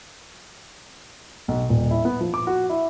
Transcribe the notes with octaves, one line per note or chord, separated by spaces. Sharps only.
B1
D#1
E4
B3
F3
D6
F#4
E4